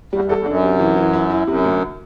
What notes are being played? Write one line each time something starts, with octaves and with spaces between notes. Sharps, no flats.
E2 G3
E2
A4
E2
F#2 D4
C3
E3
E3
E4
E4
F#2 C3
D2